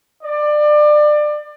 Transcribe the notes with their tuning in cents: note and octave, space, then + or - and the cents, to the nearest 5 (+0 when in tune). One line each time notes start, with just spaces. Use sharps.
D5 +25